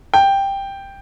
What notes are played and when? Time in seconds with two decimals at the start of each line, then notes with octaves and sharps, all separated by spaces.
0.14 G5